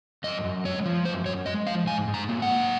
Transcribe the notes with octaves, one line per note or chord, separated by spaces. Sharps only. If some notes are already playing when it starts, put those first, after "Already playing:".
F#2 D#5
F#2
G#3 C#5
F3
F#2 C5
F#2 C#5
G#3 D#5
F3 F5
G#2 G#5
G#2
A#5
A#3
F#5
F#3